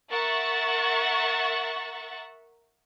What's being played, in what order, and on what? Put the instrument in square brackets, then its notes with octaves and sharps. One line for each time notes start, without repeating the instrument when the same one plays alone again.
[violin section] A#4 E5 F#5 C#6 A6